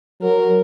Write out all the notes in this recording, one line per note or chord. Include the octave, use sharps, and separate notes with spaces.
F#3 A#4